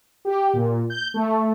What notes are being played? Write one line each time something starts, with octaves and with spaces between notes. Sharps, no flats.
G4
A#2
G6
A3